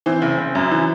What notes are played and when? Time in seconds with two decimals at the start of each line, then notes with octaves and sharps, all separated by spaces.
0.06 E3 C4
0.22 F#1
0.39 F#1
0.55 F#2
0.71 E3